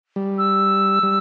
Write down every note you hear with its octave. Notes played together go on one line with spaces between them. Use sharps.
G3
E6
G3